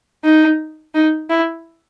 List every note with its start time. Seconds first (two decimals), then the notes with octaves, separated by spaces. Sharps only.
0.24 D#4
0.94 D#4
1.30 E4